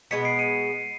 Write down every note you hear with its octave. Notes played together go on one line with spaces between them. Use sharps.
B2 G#3 B3 B6 C#7
C7 D7
C#7 D#7